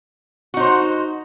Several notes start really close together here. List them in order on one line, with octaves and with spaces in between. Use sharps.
F#4 D#4 C5